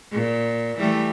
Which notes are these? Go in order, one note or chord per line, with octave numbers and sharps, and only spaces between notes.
A#2
E3 G3 A3